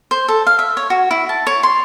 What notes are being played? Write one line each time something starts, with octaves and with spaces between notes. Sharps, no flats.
C5
A4
F5
E5
C#5
F#4
E4
A5
C#5
C6